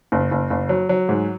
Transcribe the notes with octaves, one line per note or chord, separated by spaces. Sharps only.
F#1
F#1
F#1
F#3
F#3
G#2